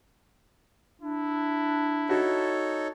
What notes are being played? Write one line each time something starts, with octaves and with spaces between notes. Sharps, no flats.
D4 E4
D#4 F#4 A4 C#5